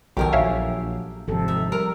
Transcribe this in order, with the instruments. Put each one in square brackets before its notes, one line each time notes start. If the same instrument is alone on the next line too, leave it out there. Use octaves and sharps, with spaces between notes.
[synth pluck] B1 D#3 [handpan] F#3 F#4 A4 [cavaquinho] G4 A#4 G#5
[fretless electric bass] A#1 [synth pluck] C#5 E5 F5
[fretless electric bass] G#1 C3 [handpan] F3 A4
[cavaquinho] D#4 E5
[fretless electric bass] G3 [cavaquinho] A#4 E5 A#5